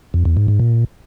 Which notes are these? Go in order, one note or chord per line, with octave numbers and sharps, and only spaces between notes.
F2
E2
G#2
G#2
A#2